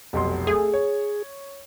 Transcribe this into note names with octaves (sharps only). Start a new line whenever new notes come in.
F1 B1 C6
A3 G#4
C#5